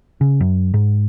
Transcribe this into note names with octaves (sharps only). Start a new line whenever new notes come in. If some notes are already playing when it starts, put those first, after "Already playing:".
C#3
F#2
G#2